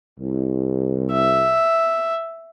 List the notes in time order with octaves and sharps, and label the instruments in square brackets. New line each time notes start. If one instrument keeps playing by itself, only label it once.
[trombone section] C2
[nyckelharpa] E5